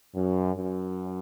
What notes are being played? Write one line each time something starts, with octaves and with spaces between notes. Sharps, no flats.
F#2
F#2